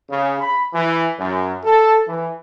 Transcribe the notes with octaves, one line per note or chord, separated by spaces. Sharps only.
C#3
B5
E3
F#2
A4
E3